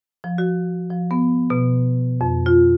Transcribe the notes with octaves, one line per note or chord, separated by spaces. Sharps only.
F3
F#4
F3
B3
B2
F2
F4